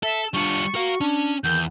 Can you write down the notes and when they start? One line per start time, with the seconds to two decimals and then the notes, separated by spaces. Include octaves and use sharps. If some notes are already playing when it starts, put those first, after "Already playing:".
0.03 A4 E5
0.34 G3 D4 F4 C#6
0.75 F#4 A#4 F5
1.01 C#4 D4
1.44 E2 D#3 G6